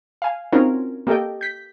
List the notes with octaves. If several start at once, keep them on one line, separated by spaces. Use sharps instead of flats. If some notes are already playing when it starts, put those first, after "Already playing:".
F5 G#5
C4 C#4 D#4 F4 F#4 A#4
A#3 G4 A4 D#5 G5
G6 B6